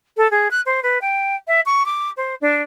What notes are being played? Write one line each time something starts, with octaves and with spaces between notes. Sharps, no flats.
A4
G#4
F#6
C5
B4
G5
E5
C#6
D6
C5
D4